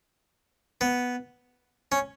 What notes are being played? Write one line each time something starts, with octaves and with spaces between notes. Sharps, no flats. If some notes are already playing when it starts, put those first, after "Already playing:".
B3
C#4